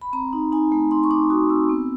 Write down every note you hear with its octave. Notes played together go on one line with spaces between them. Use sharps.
B5
C4 A#5
D#4
D#4 G#5
A3
D#4 C6
C#6
D#4 D6
F#4 D#6
C4 E6
B3